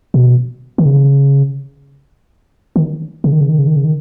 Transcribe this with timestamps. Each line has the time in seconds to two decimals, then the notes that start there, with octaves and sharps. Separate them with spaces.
0.14 B2
0.78 D#3
0.86 C#3
2.76 D#3
3.24 C#3
3.32 D#3
3.41 C#3
3.49 D#3
3.58 C#3
3.67 D#3
3.76 C#3
3.85 D#3